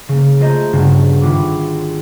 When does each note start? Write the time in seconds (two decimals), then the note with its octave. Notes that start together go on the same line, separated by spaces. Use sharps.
0.09 C#3 A#3
0.40 A3 F4 C5 D#5 A#5 G6
0.73 G1 G2 C#3 F#4 G#4 A5
1.21 G#1 F4 F#4 B5 D6